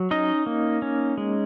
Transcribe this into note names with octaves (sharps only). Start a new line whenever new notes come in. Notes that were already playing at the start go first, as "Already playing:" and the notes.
Already playing: F#3
C#4 D#4 D#5
A#3
C#4
G#3